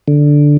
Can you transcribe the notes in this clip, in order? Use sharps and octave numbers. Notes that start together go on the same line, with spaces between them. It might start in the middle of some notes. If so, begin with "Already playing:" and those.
D3